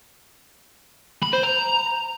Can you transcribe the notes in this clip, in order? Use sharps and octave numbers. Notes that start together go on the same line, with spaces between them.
B5
C5
A#5